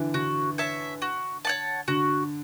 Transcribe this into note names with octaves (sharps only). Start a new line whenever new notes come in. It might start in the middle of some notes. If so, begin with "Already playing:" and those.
Already playing: D3 E3
D3 F#4
C#5 E5 A5
F#4
C#5 F#5 A5
D3 F#4